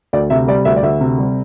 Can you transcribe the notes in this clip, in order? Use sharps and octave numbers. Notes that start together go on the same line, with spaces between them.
D2 D5
C3 E5
G3 D5
D2 E5
D5
D2 E5
C3
G3